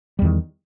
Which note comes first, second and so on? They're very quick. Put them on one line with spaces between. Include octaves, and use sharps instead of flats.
G3 E2 D#3